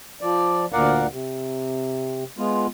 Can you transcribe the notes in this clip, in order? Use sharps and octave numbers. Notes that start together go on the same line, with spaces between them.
F3 D5
D2 A#2 A#4 D5 F5 F#5
C3
G#3 B3 F4